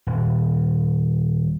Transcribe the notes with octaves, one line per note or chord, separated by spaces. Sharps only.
D#1